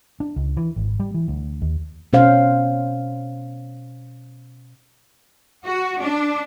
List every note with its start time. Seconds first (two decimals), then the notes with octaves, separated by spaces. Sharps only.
0.20 D4
0.36 C#2
0.57 E3
0.76 G#1
0.99 G3
1.14 E3
1.28 D2
1.62 D#2
2.13 B2 C#4 C5 F5
5.66 F#4
6.01 D4